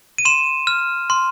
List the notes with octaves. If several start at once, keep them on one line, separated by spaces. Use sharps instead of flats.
D#7
C6 E7
F6
C6